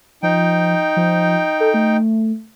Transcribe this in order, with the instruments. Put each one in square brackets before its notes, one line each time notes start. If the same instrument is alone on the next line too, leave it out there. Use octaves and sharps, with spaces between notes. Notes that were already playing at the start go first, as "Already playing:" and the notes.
[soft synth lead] F3 [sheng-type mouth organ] D#4 G5
[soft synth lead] F3
A4
A3